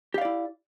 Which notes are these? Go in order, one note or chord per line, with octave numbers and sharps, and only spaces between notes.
E4 G4 D5 F5